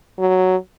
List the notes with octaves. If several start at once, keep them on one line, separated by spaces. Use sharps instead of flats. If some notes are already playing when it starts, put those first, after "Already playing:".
F#3